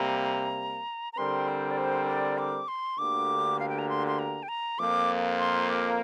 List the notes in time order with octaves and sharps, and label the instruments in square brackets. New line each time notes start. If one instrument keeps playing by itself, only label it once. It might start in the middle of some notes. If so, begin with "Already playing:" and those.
Already playing: [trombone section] C3 G3 A#3 [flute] A#5
[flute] A#5
[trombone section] D3 G3 C4 A#4 [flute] C6
[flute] C5
D5
C5
D5
D6
C6
[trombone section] D2 D3 A#3 G4 [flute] D6
[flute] F5
G5
A#5
C6
C6
A#5
G5
A#5
[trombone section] F2 F3 A#3 [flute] D6
[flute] C6
D6